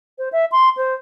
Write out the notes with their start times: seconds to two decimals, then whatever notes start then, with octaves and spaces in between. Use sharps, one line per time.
0.18 C5
0.32 E5
0.52 C6
0.77 C5